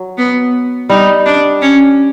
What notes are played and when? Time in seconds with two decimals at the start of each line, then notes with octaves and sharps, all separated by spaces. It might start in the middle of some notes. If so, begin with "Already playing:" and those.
Already playing: F#3
0.18 B3
0.90 G3 D#4
1.26 D4
1.62 C#4